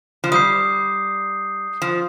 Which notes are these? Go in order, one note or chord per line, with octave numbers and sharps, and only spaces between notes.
F3
G3 D#6 G6 C7
F3